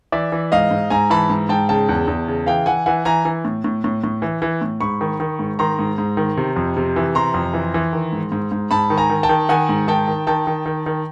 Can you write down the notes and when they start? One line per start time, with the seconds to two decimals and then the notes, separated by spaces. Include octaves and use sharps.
0.12 E3 D5 E5
0.32 E3
0.52 G#2 D#5 F5
0.71 G#2
0.90 G#2 G#5 A#5
1.10 E3 A5 B5
1.30 G#2
1.49 G#2 G5 A5
1.69 C#3 G5 A5
1.89 E2
2.07 E2
2.28 C#3
2.46 E3 F5 G5
2.66 E3 F#5 G#5
2.86 E3 F#5 G#5
3.05 E3 G#5 A#5
3.25 E3
3.45 A2
3.64 A2
3.84 A2
4.04 A2
4.22 E3
4.42 E3
4.62 A2
4.81 G#2 B5 C#6
5.01 D#3
5.20 D#3
5.39 G#2
5.59 D#3 A#5 C6
5.79 G#2
5.98 G#2
6.17 D#3
6.37 C3
6.56 F2
6.77 C3
6.96 E3
7.15 C3 A#5 C6
7.34 F2
7.54 E3
7.74 E3
7.93 D#3
8.12 G#2
8.32 G#2
8.52 G#2
8.71 G#2 A5 B5
8.90 D#3
8.97 G#5 A#5
9.10 D#3
9.23 G5 A5
9.29 D#3
9.49 D#3 F#5 G#5
9.69 G#2
9.88 D#3 G5 A5
10.08 D#3
10.27 D#3 G5 A5
10.47 D#3
10.66 D#3
10.86 D#3